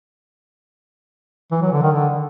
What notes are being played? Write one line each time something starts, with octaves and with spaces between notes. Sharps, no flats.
E3
F#3
D3
D#3
D3